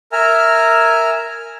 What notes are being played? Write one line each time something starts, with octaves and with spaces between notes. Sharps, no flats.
A#4 E5 G#5 A#5 F6